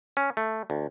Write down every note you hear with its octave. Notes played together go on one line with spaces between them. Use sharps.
C#4
A3
D2